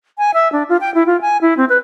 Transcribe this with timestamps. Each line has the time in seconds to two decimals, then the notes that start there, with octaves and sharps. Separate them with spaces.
0.18 G#5
0.34 E5
0.52 D4
0.69 F4
0.81 G5
0.94 E4
1.06 F4
1.21 G#5
1.41 E4
1.57 C4
1.69 B4